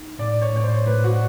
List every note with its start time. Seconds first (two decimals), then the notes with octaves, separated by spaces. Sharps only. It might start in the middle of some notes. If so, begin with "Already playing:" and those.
Already playing: D#4
0.19 A2 D5
0.42 C#5
0.53 A2 C#5
0.64 C5
0.86 A2 B4
1.04 F#4